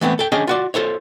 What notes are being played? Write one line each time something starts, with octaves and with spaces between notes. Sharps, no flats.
E3 A3 B3 C4
A4 G5
C#4 D4 G#4 C#5 D#5 G5
F4 F#4 D5
F4 A4 C5 C#5